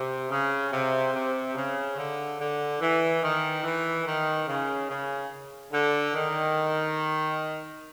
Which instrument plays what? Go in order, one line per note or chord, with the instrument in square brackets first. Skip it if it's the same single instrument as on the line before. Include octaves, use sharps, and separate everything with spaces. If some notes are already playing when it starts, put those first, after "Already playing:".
Already playing: [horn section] C3
C#3
C3
C3
C#3
D3
D3
E3
D#3
E3
D#3
C#3
C#3
D3
D#3